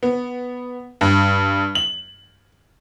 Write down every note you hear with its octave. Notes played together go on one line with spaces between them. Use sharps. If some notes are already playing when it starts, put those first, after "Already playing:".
B3
G2
F#7